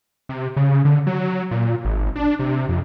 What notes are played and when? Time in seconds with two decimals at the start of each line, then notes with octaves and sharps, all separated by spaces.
0.29 C3
0.57 C#3
0.85 D3
1.07 F#3
1.51 A#2
1.85 G#1
2.16 D4
2.39 C3
2.69 F2